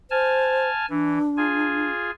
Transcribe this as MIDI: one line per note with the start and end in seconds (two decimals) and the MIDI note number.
0.11 0.69 72
0.11 0.86 80
0.11 0.86 81
0.11 0.86 89
0.90 1.19 52
0.90 1.90 62
1.37 2.11 65
1.37 2.11 68
1.37 2.11 80